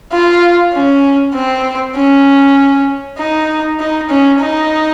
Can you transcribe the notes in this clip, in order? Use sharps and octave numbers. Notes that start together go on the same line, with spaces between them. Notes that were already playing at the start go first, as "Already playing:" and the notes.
F4
C#4
C4
C#4
D#4
D#4
C#4
D#4